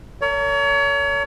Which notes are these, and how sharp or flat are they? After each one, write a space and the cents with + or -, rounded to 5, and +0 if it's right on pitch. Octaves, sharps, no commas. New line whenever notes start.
A#4 -35 C#5 +35